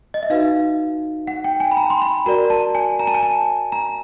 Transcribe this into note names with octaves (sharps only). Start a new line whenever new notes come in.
D#5
E5
D#4 F#4 B4 F5
F#5
G5
G#5
B5
A#5
C6
B5
F#4 A#4 D5 A#5
A5
G#5
A#5
A5
G#5
A5
A#5